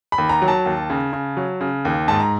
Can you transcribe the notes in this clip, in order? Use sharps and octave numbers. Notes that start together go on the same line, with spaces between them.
B5
D#2
A#5
F#3
A5
D#2
C#3
C#3
F#3
C#3
D#2
G#2 A5
A#5